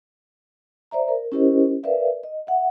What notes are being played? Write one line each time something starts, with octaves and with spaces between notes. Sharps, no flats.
C5 D5 E5 A#5
A#4
C#4 E4 G4 A#4 C5 D#5
A#4 B4 D5 E5 F5
D#5
E5 F#5